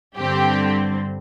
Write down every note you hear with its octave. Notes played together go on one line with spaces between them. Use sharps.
G2 D3 G3 C4 G4